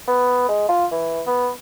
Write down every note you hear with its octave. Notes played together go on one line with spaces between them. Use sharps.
B3
G#3
F4
E3
B3